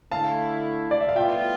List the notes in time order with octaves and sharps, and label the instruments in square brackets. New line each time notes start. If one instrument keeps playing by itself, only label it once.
[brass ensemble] D3 A3 E4 [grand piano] F5 A5
[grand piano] D5
E5
F5
[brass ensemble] A2 G3 B3 F4 [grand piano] E5 G5